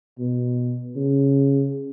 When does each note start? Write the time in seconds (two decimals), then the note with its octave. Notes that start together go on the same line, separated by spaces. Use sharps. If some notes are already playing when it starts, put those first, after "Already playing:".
0.19 B2
0.96 C#3